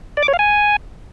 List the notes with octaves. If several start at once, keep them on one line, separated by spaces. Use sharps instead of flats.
D5
D6
C#5
F5
G#5